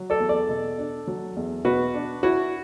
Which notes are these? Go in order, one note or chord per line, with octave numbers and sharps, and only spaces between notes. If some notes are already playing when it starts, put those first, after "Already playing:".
Already playing: F#3
A4 D5
E2
A4 D5
B2
D4
F#3
E2
B2 F#4 B4
D4
E4 F#4